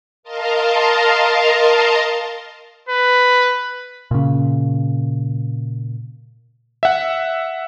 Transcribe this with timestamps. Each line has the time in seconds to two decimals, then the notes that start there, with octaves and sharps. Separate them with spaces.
0.23 A#4 D#5 F5 A5 A#5 C6
2.89 B4
4.11 A#2 C#3
6.83 E5 F#5